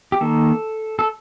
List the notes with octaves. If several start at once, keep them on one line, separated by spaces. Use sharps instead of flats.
G4
D#3 A#3 A4
A4